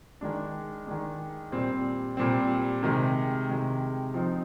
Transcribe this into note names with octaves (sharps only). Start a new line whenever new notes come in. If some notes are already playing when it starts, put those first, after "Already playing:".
D#3 G#3 D4
D#3 G#3 D4
A#2 G3 C4
A#2 G3 C4
C3 D#3 G#3
C3 D#3 G#3
F3 C4 D#4